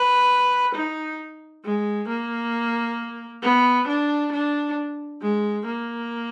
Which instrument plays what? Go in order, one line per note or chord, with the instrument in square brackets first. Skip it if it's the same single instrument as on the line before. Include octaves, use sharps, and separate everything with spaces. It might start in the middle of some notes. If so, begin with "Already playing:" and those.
Already playing: [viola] B4
D#4
G#3
A#3
B3
D4
D4
G#3
A#3